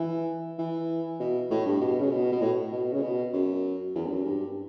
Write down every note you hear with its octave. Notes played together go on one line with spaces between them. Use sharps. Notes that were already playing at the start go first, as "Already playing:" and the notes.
Already playing: E3
E3
B2
A2
G2
B2
C#3
B2
B2
A2
B2
C#3
B2
F#2
E2
G2
F#2
G2